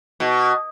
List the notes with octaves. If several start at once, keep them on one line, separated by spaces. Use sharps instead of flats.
B2